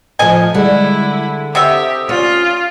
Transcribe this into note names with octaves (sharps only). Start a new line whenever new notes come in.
A2 F3 D#5 G#5
D3 G3 G#3 E4
C3 F#4 G4 E5 D#6
C#4 F4